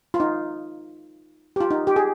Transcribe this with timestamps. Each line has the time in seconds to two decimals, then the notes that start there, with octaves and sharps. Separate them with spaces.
0.14 F4
0.20 D#4
1.56 G4
1.61 F4
1.71 D#4
1.87 G4
1.96 G#4